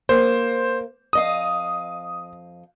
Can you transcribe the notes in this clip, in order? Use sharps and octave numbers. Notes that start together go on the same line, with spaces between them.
A#3 C5
F2 D#5 F5 D#6